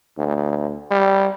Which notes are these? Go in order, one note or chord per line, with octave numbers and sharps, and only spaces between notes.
D2
G3